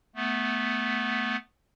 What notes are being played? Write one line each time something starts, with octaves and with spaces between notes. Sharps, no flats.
A3 B3